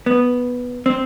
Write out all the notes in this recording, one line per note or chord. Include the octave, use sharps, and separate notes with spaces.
B3
C4